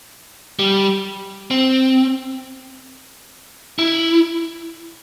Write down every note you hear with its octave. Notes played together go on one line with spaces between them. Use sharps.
G3
C4
E4